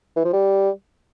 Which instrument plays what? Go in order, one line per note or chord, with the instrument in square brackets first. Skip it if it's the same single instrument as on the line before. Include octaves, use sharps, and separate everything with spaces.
[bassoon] E3
F3
G3